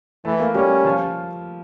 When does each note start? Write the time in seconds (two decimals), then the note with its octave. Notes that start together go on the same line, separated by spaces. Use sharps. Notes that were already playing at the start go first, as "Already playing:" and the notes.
0.25 E3 A3 A4
0.39 A#3 A#4
0.54 G3 C#4 G4
0.85 F3 F4